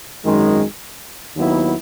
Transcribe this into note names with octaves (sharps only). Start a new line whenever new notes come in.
G#1 F#2 D#3 G#3
D#2 D#3 F#3 B3 E4